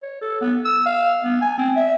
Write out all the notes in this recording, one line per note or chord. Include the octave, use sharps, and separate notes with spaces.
C#5
A4
B3
E6
F5
B3
G#5
C4
E5